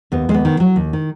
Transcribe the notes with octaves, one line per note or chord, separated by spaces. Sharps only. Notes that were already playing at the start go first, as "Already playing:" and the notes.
D#2 B3
D#2 G#3
B3
D#3
F#3
D#2
D#3